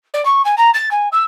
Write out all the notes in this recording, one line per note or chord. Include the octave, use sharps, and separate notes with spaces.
D5
C#6
G#5
A#5
A6
G#5
E6